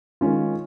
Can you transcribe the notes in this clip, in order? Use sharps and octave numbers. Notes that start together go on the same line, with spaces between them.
D#3 G#3 C#4 F4